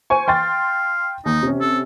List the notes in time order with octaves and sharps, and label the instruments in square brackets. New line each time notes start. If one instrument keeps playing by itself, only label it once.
[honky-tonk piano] C5 G#5 C#6
[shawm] F5 [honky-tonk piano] G5 C6 A6
[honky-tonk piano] D#2 [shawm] D#4
[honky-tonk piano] C3 C#4
[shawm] A4